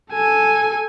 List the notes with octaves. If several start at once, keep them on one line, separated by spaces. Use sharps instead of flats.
A4 G#5